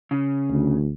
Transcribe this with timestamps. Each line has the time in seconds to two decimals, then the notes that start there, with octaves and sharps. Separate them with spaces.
0.11 C#3
0.50 D2